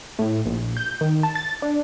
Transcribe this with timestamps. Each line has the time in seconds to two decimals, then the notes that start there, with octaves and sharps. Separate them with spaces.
0.19 A2
0.46 A#1
0.77 G6
1.01 D#3
1.23 A5
1.35 A6
1.62 D4